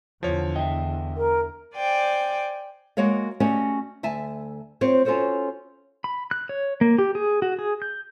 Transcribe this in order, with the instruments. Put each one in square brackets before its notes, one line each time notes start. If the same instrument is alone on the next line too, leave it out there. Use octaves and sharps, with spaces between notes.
[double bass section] E2 D3 [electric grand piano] F3 C#5
[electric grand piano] D#5 [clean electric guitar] E5 G5
[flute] A#4
[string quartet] C5 D5 G5 G#5
[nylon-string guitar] G#3 A#3 F#4 C#5 D#5 F5
A3 C#4 F#4 G4 D5 D#5
D2 E5 G#5 A5
C4 F4 G4 C5 C#5
C#4 F4 F#4 A4 C5 C#5
[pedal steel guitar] B5
F#6
C#5
A#3
G4
G#4
F#4
G#4
G6